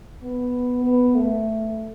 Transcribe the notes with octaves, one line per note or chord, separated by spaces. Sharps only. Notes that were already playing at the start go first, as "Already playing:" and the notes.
B3
B3
A3